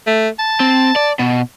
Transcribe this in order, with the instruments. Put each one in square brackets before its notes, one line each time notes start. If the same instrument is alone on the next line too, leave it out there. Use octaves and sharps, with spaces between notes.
[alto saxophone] A3
A5
[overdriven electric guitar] C4
D5
B2